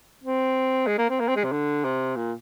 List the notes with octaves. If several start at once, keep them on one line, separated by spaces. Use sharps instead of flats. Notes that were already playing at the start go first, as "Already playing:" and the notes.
C4
G#3
A#3
C4
A#3
C4
G#3
C3
D3
C3
A#2